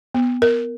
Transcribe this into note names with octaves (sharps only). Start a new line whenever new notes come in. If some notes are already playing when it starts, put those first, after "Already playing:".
B3
A#4